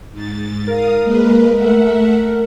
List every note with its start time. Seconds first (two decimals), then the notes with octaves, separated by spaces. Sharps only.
0.12 G#2 A6
0.67 A#4 F5 D#6
1.03 G#3 A#3 B4
1.56 A3 E5 F#5